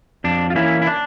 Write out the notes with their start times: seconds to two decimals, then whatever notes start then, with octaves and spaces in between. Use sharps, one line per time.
0.24 F2 D4
0.50 F4
0.55 E3 A#3 C#4 E4
0.82 E4
0.87 D4